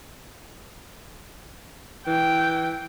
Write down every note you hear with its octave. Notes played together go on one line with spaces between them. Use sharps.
E3 G5